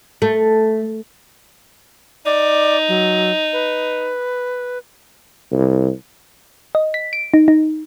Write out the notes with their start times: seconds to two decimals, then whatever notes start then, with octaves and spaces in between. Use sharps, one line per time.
0.22 A3
2.25 D#4 D5
2.88 F#3
3.53 B4
5.52 C2
6.75 D#5
6.94 B6
7.13 D7
7.34 D#4
7.48 D#4